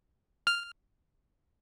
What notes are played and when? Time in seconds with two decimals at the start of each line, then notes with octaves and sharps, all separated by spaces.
0.47 F6